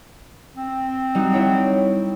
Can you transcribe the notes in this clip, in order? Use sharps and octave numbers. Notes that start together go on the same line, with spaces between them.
C4
G3 D#4 F#4
E4 C#5